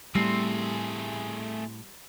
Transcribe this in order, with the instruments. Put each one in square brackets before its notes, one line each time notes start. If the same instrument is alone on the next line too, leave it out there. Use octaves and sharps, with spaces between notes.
[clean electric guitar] A2 [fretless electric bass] G3 [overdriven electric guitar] A3 G#4 [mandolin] C4